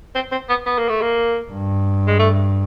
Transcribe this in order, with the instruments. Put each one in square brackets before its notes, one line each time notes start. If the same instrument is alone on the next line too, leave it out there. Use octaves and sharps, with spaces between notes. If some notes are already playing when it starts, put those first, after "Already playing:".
[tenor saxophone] C4
C4
B3
B3
A#3
A3
A#3
[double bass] G2
[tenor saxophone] G#3
A3